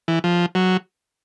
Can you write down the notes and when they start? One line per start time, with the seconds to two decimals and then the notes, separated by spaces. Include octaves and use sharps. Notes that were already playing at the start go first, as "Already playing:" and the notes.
0.08 E3
0.24 F3
0.55 F#3